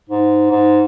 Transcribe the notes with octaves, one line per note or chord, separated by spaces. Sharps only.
G#2
G#2